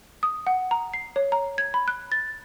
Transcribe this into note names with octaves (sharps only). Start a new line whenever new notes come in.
D#6
F#5
A#5
C7
C#5
A#5
G#6
B5
F#6
A6